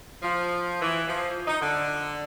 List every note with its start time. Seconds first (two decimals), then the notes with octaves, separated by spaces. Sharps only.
0.23 F3
0.81 E3
1.08 F3
1.46 D#4
1.60 D3